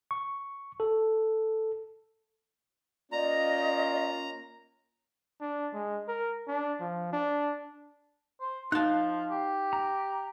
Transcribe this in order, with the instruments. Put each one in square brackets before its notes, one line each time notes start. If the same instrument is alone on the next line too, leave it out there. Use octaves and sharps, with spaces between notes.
[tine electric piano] C#6
A4
[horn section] A#3 C#4 F4 [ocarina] D5 [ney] D#5 [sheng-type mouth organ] A#5
[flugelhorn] D4
G#3
A#4
D4
F3
D4
[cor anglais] C5
[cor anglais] F3 [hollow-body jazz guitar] D#4 A5 [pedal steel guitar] F5 F#6
[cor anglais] G4
[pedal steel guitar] A#5